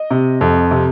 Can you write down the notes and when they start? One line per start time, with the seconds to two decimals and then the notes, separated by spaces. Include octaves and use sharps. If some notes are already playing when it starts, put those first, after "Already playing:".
Already playing: D#5
0.11 C3
0.41 F2
0.71 C3